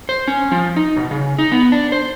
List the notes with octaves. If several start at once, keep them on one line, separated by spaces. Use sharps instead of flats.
C5
C#4
F3
D#4
B2
C#3
D#4
B3
D4
C5